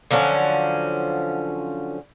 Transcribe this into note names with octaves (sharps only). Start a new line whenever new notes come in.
D3 F3 F#3 C#4